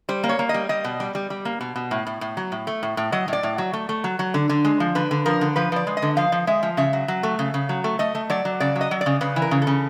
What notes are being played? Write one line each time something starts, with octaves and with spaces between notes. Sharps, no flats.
G3 C5
A#3
C#5
A#3
D#5
G3
G3 D#5
B2
G3
G3
G3
A#3
B2
B2
A2
A2
A2
F#3
A2
A3
A2
A2
F#3 D#5
A2 D5
A2
F#3
A3
A3
F#3
F#3
D3
D3
G#3
F3
D3 B4
D3
F3 A#4
D3
F3 B4
F3 D5
G#3
D#5
D3
F3 F5
F3
G#3 E5
F3
C#3 E5
F#3
F#3
A3
C#3
C#3
F#3
A3
A3 D#5
A3
F#3 D5
F#3
C#3 D5
F#3
D#5
F#3
D5
C#3
C#3 B4
E3
A#4
C#3
A4
C#3